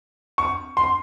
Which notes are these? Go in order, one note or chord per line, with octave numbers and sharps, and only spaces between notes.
C#6
C6